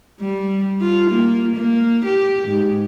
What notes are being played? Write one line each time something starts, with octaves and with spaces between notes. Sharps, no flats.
G3
F4
A#3
A#3
G4
G#2